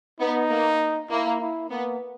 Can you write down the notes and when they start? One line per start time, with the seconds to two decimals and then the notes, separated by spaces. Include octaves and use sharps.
0.20 B3 D#4
0.50 A#3
1.10 A#3 E4
1.40 E4
1.70 A#3 B3